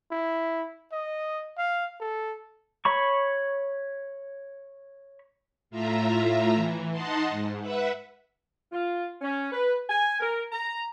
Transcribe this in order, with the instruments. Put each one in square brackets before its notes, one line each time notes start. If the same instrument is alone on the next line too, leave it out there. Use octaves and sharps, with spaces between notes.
[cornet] E4
D#5
F5
A4
[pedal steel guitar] C#5 B5 C#6
[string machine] A2 F4 E5 A#5
E3
D#4 D#5 F#5 A5 C6
G#2
B4 E5 F#5
[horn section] F4
C#4
B4
G#5
A#4
A#5